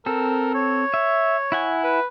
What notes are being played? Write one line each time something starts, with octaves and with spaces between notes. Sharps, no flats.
C4 A4 A#4
C#5
E5
E4 F#5 G#5
B4